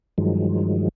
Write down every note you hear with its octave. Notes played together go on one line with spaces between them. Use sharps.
G2 D#3 F3 F#3 G#3